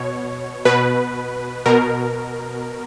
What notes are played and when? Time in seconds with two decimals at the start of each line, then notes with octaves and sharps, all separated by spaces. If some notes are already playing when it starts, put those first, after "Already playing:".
Already playing: B2 C#5
0.65 B2 B4
1.66 B2 A#4